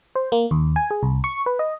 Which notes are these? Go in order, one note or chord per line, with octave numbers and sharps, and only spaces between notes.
C5
A#3
D#2
G#5
G#4
C2
C#6
B4
D#5